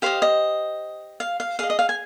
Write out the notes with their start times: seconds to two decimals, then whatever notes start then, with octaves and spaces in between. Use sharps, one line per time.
0.02 G4 C5 D#5 F5
0.22 D#5
1.20 F5
1.40 F5
1.59 G#4 D#5 F5
1.70 D#5
1.79 F5
1.89 G#5